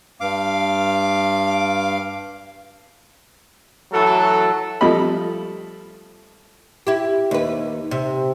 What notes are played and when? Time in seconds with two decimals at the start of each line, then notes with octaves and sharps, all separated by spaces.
0.21 G2 F5 D6
3.92 E3 F#3 A3 F#4 A4
4.81 F3 G3 A3 D#5 B5
6.87 E4 G4
7.31 D#2 B4
7.91 C3